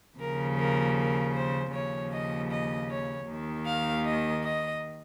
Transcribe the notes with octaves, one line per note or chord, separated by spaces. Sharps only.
D#2 C#3 F3 A#4
A#4
A#4
C5
D#2 C#3 F3 C#5
D#5
D#5
C#5
D#2 D#3
F5
D#5
D#5